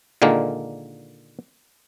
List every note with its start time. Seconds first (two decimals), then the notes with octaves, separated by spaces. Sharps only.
0.22 A#2 D3 D#3 G#3 A#3